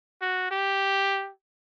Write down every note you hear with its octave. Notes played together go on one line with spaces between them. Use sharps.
F#4
G4